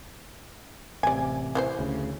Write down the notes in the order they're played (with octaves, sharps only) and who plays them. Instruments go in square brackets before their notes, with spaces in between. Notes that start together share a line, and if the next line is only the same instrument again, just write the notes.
[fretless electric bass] A1 C3 [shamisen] D5 G#5
[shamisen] E3 F#4 C5
[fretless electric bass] D2 C#3